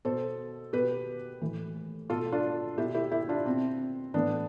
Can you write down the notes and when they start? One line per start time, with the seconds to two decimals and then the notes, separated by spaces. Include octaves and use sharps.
0.05 B2 A4 C5
0.73 B2 G4 B4
1.41 A2 E3
2.10 B2 F4 A4
2.32 D4 F4
2.78 B2 E4 G4
2.95 E4 G4
3.12 E4 G4
3.29 D4 F4
3.45 B2 C4
4.14 A2 E3 B3 D4